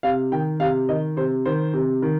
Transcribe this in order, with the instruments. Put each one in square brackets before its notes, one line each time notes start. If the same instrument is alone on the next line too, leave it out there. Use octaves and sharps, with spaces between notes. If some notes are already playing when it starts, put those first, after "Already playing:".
[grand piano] C3 F5
D#3 G5
C3 F5
D#3 D#5
C3 C5
D#3 C5
C3
D#3